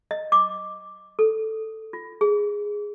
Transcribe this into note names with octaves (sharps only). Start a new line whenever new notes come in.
D#5
D6
A4
F4
G#4